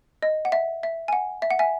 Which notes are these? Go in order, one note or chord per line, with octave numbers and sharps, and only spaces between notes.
D#5
F#5
E5
E5
G#5
F#5
E5
F#5
E5 G#5